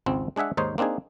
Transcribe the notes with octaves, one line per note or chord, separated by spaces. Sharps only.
G#1 C#2 C4
G#3 D4 G#4 E5 F#5
D#2 G#2 D#4 C5 C#5
A#3 C4 D4 D#4 G#4